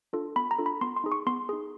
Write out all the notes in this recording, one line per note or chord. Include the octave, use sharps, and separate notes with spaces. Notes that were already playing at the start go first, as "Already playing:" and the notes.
D4 F4 A4
B3 B5
A#5
D4 F4 A4
B5
B3 C6
C6
D#4 G#4
C#6
B3 C6
D#4 G#4